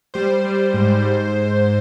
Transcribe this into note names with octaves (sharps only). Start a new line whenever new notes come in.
G3 C5
G3
G#2
G#2